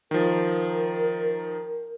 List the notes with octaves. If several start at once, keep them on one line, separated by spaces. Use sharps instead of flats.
D#3 F3 A#4